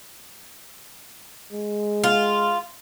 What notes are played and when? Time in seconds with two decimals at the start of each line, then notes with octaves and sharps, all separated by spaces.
1.52 G#3
2.04 F4